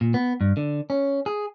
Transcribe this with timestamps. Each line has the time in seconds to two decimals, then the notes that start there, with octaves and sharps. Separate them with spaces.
0.01 A#2
0.14 B3
0.41 G2
0.57 D3
0.90 C#4
1.26 G#4